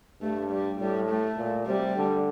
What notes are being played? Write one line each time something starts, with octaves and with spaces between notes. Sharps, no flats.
G2 A3
G3
A2 G3
A3
A#2
C3 G3
D3